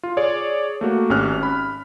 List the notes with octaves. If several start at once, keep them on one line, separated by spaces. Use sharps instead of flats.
F4
G#4 C#5 D5
A3 A#3 F#4
G#1 C#4 G4 F6 F#6
B5